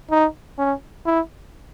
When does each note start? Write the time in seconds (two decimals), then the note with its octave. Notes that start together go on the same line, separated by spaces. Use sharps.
0.11 D#4
0.58 C#4
1.06 E4